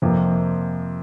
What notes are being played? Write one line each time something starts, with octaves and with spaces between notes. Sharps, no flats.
F2 C3 F3 A#3